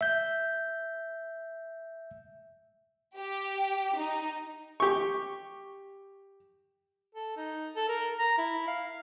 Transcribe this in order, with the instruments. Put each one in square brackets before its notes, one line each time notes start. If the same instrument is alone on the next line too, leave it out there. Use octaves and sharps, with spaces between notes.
[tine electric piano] E5 G6
[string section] G4
D#4
[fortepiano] G4 C#6
[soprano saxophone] A4
D#4
A4
A#4
A#5
E4
F5